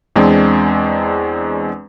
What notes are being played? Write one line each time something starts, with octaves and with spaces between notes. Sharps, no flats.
E2 G#3 C4 D4